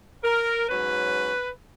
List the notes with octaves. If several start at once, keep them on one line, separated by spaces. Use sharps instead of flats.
A#4
G#2 F#3 C#4 B4